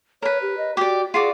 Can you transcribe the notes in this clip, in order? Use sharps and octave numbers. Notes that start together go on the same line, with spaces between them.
A#4 B4 C#5
G4
D#5
F#4 G4 D5
F4 F#4 G#4 D5